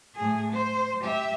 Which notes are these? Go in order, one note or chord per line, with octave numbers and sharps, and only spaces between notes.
A2 G#4
C5
G4 E5